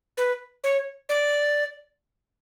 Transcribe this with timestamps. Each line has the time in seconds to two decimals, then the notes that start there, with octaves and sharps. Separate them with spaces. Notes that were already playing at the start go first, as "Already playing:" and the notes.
0.17 B4
0.64 C#5
1.09 D5